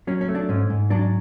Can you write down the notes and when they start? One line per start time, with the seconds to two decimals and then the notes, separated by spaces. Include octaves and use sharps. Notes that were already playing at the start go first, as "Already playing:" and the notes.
0.07 F#3 C#4
0.21 C#4
0.28 A3
0.35 D4
0.49 G#2 C#4
0.70 G#2
0.90 F#3 D4